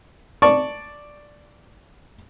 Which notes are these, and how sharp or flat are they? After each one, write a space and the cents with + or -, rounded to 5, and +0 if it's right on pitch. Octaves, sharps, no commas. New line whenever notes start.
D5 +0 A5 +0 C#6 +0